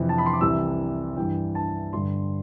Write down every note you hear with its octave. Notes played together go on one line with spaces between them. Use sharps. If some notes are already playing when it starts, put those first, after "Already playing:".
Already playing: F2 C3 E3
A5
B5
C6
D6
C2 C3 E3 E6
G2 E3 G5
A5
G2 D3 C6